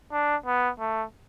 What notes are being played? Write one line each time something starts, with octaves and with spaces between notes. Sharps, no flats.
D4
B3
A3